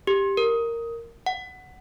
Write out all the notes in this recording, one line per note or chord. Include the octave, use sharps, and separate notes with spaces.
G4
A#4
F#5